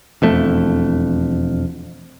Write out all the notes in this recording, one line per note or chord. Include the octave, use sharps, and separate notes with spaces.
E1 F2 A3